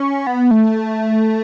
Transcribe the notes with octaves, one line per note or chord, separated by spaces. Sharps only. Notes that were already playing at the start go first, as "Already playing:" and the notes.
Already playing: C#4
B3
A3